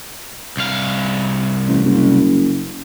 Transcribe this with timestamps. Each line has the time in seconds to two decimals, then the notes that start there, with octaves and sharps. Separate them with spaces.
0.57 C2 F5
1.68 A1
1.84 F#1